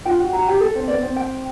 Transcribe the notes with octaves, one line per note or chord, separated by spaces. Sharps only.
F4 G5
F#4
F#4 A#5
G4
A4
C4
B3 D5
C4
G5